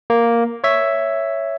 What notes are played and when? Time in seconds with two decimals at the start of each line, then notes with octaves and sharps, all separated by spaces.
0.10 A#3
0.64 C#5 E5